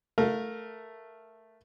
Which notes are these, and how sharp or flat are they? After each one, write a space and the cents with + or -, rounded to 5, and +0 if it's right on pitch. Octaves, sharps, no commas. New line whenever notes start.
A3 +0 A#4 +5 F5 +25